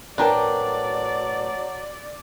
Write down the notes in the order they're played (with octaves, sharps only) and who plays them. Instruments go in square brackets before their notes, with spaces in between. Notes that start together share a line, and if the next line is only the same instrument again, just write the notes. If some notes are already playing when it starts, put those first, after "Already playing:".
[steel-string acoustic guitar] A2 B4 G5 [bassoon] F#3 [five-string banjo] D4 A#4 A5 [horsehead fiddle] D5